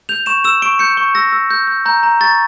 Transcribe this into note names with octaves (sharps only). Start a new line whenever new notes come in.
G6 F7
C#6 E7
E6 E7
C#6 D7
G6 C#7
C#6
E6 A#6
E6
G6
G6
A#5 G6
A#5
C#6 A6